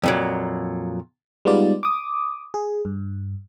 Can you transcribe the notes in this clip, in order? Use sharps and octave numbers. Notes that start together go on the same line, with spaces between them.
F2 A#2 F#3
G3 G#3 B3 D#4 F4 D5
D6 D#6
G#4
G2